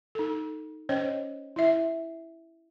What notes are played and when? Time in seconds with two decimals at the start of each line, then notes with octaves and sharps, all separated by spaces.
0.15 D#4 A4
0.89 C#4 C5 C#5 D#5 G5
1.56 E4 E5